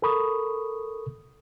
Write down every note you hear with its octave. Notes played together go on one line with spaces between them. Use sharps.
A4 A#4 B5 C#6 D#6